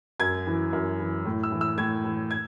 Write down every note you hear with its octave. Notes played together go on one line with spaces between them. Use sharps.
F#2 G#6
E3
F#2
E3
A2
E6
E3
E6
A2 G#6
E3
G#6